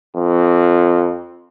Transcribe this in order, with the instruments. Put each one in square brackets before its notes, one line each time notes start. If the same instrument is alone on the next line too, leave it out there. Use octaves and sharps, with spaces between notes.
[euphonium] F2